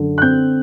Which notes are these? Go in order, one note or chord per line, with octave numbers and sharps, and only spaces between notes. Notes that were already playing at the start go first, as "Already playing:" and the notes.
Already playing: F#2 D3
F#6
C4 G6